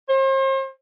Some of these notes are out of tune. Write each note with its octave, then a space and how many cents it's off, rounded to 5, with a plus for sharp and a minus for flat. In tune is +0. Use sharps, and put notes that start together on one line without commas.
C5 +40